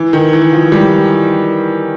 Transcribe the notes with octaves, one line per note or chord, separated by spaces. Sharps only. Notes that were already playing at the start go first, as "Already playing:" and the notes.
Already playing: E3
D#3
E3
F3
G3